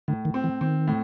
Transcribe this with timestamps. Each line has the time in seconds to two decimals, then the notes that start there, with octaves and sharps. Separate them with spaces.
0.08 A2 D3
0.25 D#3
0.34 C4
0.44 E3
0.61 D#3 C4
0.88 A2